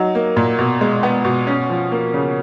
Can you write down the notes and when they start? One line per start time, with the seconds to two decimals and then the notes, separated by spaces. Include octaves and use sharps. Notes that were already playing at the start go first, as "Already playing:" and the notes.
Already playing: F#3 D#4
0.15 A#3
0.37 A#2
0.59 B2
0.81 G#3
1.03 B3
1.25 B2
1.47 C#4
1.70 F3
1.92 A#3
2.14 C#3